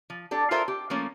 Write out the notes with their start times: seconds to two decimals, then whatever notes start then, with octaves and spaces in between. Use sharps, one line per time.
0.10 F3
0.31 D4 G4 A4
0.51 F4 A4 A#4 C5 E5
0.68 G4
0.90 F3 A3 A#3 C#4